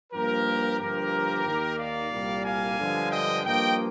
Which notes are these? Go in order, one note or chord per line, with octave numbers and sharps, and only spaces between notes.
G2 F3 A#3 G4 A#4
G2 D3 F3 A#3 G4 A#4
D#2 D#3 A#3
D5 F5
C2 A#2 G3 A#3
F5 G#5
G2 D3 F3 G#3
D#5 G5
G2 F3 A#3 D#5 G5